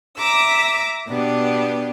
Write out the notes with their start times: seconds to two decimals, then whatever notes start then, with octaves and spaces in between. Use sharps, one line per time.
0.17 E5 A#5 D6 E6
1.07 B2 B3 D4 G4